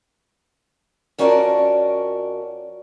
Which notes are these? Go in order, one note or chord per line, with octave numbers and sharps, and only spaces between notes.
F2 C#4 F#4 A#4 D5 A5